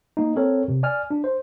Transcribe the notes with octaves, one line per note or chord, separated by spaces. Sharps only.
A#3 D#4
C4 A4 A#4 C#5
C3
D5 G#5 F6
D4
C5